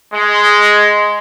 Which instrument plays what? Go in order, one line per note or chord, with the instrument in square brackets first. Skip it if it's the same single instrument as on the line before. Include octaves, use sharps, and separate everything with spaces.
[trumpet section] G#3